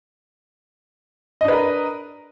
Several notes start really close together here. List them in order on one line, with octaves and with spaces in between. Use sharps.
D#5 D4 B4 A#4